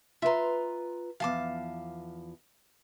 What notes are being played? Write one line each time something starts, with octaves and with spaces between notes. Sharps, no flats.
F4 B4 E5 A#5 C6
E2 F3 F5 A5 D6